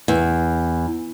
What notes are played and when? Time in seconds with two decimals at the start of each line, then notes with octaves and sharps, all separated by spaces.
0.08 E2